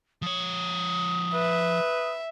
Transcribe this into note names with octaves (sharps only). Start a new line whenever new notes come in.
F3 C#5 D#6
B4 E5